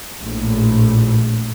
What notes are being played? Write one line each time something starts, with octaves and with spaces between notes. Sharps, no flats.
A#1 A2